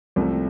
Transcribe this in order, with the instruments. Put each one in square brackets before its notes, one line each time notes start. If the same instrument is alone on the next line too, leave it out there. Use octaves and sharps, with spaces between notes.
[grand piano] C2 C3 F3 A3